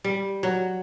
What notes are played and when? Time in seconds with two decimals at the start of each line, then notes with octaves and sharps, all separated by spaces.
0.04 G3
0.43 F#3